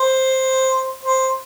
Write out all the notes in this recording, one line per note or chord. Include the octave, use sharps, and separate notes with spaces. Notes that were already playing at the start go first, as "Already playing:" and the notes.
Already playing: C5
C5